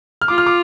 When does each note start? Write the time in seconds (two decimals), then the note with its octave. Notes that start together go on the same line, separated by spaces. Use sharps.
0.22 F6
0.28 F4 D6
0.38 F6
0.46 D6